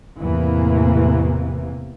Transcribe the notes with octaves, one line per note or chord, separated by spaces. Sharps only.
E2 A2 C3 E3 A#3